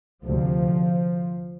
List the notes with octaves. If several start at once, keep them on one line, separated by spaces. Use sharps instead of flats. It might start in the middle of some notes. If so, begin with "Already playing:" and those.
D2 C3 F3